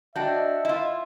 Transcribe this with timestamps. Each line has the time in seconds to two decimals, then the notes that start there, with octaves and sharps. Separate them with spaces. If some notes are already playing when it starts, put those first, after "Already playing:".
0.16 D4 F#4 D#5 E5 G5 A5 G6
0.65 E4 F4